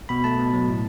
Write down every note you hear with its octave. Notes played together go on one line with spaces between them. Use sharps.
B2 B5
A3 A5
B2
F#3
A2